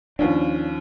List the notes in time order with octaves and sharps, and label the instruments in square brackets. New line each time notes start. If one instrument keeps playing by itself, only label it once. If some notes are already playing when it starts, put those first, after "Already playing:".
[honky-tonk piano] D#2 F3 C#4 [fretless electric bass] D4